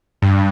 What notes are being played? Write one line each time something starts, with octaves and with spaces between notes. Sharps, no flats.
G2